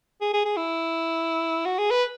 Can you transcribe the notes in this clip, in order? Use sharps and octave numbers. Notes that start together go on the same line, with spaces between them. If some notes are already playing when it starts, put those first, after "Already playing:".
G#4
G#4
G#4
E4
F#4
G#4
B4